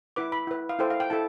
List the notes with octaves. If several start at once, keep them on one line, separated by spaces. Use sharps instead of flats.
E4 B4 D6
B5
E4 B4
F5
E4 A4 C5 G5
F5
G5
E4 A4 A5